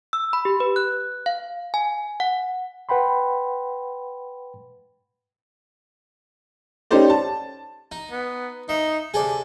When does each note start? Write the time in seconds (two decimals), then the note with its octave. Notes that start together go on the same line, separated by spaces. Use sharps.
0.13 E6
0.33 B5
0.45 G4
0.60 B4
0.76 F#6
1.26 F5
1.74 G#5
2.20 F#5
2.89 B4 F#5 G5 B5 C6
6.91 C#4 D#4 G4 A4 C5 D5
7.10 A5
7.92 D#4
8.11 B3
8.69 D#4 E5
9.14 C3 G#4 A4 D5